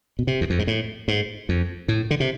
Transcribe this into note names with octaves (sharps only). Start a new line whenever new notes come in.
B2
C3
E2
F2
G#2
A2
G#2
F2
A2
D3
C3